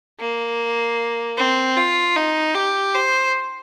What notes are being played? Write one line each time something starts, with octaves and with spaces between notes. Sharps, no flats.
A#3
C4
F4
D#4
G4
C5